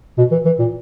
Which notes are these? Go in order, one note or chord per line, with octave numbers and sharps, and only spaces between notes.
B2
E3
E3
A#2